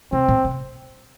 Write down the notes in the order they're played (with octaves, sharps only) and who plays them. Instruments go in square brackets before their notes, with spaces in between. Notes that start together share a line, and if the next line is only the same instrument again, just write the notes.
[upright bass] C3 [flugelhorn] C4
[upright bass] A#2
C3